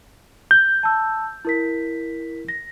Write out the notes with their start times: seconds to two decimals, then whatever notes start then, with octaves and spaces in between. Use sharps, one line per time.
0.51 G6
0.83 A5 E6
1.45 E4 A#4 B6
2.48 A#6